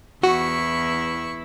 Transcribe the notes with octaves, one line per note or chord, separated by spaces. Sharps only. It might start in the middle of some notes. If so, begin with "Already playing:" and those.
E2 E4 F#4 C#6